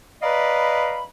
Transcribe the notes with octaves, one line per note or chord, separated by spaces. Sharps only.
B4 D5 D#5 F5 A#5 B5